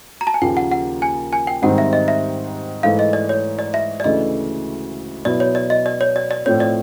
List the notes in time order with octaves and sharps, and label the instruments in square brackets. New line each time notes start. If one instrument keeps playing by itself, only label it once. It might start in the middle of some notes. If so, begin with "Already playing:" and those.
[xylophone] A#5
A5
G#5
[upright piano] D#2 C#3 F3 A#3 [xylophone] G5
[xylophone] F#5
F#5
G#5
G#5
G5
[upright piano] G#2 D#3 G3 C4 D#4 [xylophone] F#5
[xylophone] E5
D#5
E5
[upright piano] G#2 E3 A3 [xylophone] F5
[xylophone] D#5
D5
C#5
D5
E5
D5
[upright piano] D2 C#3 E3 A3 [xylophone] D#5
[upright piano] B2 F#3 B3 E4 [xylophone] D5
[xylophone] C#5
D5
D#5
D5
C#5
D5
D5
[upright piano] A2 F3 A3 C4 [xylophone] C#5
[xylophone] D5